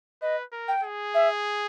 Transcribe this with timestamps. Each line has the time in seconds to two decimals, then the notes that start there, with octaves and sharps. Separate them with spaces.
0.22 B4 D#5
0.52 A#4
0.68 G5
0.83 G#4
1.14 E5